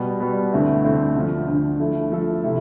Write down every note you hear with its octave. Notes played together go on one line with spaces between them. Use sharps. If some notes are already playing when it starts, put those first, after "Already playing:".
Already playing: B2 G3 B3
B2 G3 B3
D2 D3 A3 C4 E4
D2 D3 A3 C4 E4
D2 D3 F3
D2 D3 F3
F3 A3 E4 A4
F3 A3 E4 A4
C3 F3 A3 E4